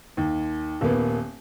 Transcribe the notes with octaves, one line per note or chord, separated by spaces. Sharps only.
D#2
D#1 A#3 B3